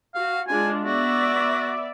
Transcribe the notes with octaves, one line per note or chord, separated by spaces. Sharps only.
F#4 F5
G#3 D4 F4 G#5
B3 F#4 D5 E5